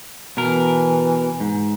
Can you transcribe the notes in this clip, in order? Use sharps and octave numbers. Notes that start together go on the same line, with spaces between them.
B2 E3 A#4
G#2